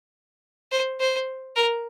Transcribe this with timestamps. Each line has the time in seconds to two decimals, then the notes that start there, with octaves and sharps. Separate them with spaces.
0.72 C5
1.00 C5
1.56 A#4